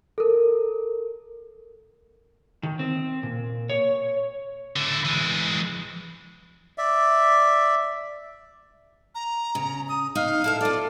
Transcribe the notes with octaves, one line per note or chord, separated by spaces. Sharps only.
A4 A#4
D#3
C4
A#2
C#5
D3 E4
E3 G#3
D5 E5
A#5
C#3
D#6
D#4 F5
E4 A4 E5
F4 A4 D5